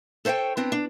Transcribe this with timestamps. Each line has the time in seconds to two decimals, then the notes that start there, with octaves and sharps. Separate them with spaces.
0.25 A4 C5 C#5 F5 G5
0.57 B3 C4 D4
0.72 D4